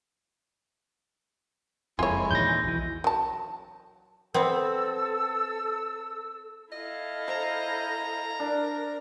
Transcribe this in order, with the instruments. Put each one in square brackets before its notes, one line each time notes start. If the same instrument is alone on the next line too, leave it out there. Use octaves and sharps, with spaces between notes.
[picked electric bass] F#1 F2 [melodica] G#3 E4 [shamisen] F4 C#5 [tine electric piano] G#5
[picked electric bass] E2 A#2 D#3 [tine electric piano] G6 A#6
[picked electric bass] B1 E3
[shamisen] F#3 A5
[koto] B3 C4 [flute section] A4 E6
[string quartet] E4 A4 F5 [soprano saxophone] D#5
[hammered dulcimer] C5 [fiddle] A#5
[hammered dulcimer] D4 [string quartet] A#4